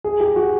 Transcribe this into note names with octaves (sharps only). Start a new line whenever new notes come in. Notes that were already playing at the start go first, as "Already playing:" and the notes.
G#4
G4
F#4